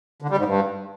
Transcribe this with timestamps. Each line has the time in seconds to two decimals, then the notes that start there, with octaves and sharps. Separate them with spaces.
0.22 D3
0.30 G3
0.38 G#2
0.45 G2